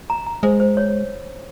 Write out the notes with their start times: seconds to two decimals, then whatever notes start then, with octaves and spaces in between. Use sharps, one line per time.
0.10 A#5
0.26 A#5
0.43 G#3 C5
0.60 C5
0.77 C#5